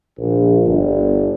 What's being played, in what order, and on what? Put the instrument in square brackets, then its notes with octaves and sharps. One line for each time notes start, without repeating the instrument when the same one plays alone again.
[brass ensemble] A#1
G1